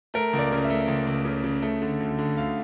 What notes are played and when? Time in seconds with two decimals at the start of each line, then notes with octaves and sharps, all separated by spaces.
0.14 A3 A#4
0.33 C#2
0.38 D5
0.52 C#3
0.64 E5
0.70 A3
0.88 C#2
1.07 C#2
1.25 C#3
1.44 C#3
1.62 A3
1.82 D3
2.00 D2
2.19 D3
2.37 D2 F5